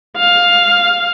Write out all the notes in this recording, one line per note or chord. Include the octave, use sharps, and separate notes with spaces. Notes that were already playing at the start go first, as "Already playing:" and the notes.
F5